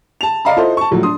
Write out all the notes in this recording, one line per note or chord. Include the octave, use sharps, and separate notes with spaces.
A5 F7
D5 D#5 F5 A#5 B5
E4 F4 A4 C5 D#5
A5 C#6
A#1 A2 F3 F#3
D4 C6 D#6